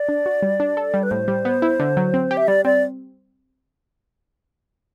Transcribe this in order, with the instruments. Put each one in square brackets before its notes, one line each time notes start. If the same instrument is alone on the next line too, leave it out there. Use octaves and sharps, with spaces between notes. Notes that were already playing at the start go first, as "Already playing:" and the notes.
Already playing: [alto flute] D5
[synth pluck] D4
F#4
G3
D4
A4
G3
[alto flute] B4
[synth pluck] A2 [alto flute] C5
[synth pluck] G3
B3
E4
D3
F#3
C4
G4
[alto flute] E5
[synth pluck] G3 [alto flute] D5
[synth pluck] C4 [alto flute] D5